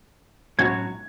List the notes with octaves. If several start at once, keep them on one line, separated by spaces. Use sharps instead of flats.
A2 F#3 C#4 F#4 C#5 G#6